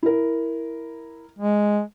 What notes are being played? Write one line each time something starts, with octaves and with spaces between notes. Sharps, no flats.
E4 A#4
G#3